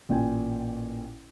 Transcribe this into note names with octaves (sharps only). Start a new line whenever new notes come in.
A1 A#2 G5 G#5